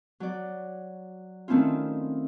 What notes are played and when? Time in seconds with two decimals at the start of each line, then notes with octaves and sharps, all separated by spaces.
0.20 F#3 D5
1.48 D#3 A3 C4 C#4 E4 F4